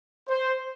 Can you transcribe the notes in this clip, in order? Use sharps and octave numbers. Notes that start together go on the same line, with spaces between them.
C5